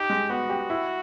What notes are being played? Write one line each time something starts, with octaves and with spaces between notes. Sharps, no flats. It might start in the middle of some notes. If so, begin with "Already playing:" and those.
Already playing: D#4 G4
G#3
B3 F#4
G4
E4